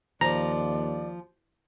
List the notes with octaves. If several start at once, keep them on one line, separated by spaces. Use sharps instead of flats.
D#2 F3 D5 A#5